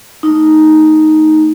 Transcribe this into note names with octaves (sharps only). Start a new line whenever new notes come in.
A3 D#4